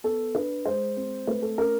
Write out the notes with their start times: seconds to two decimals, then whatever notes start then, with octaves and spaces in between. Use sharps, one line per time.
0.04 B3 A4
0.35 D4 B4
0.65 G#3 C5
0.97 C4
1.27 A3 B4
1.42 A4
1.58 C#4 A#4